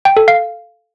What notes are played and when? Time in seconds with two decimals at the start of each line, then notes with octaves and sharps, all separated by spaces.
0.05 G5
0.17 A4
0.28 F5